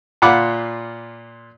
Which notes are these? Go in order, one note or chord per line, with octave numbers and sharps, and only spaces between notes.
A#2 F4 F#5 B5 D6